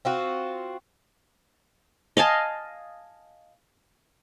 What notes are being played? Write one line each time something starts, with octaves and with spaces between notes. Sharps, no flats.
C4 F4 F#4
D#5 F5 G#5 A5